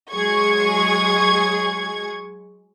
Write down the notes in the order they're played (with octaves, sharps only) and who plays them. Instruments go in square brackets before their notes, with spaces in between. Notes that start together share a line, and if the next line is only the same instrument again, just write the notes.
[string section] F#3 G#3 G#4 C#6 G#6